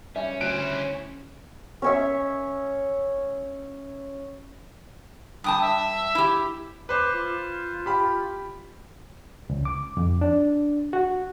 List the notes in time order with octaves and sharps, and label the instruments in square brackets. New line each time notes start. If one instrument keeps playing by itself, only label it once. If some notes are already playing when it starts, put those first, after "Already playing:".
[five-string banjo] G3 E5 G#5 [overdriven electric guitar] C#4
[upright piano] D2 F#6 D7 [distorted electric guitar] E4 C5
[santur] C#4 C#5 E5
[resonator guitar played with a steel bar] G2 G5 A5 [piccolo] D#6
[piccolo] E5
[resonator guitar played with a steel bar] E4 G4
[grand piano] B4 C5 [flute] D6
[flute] F4
[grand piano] G4 B5
[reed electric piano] C#2
D6
F2
D4
F#4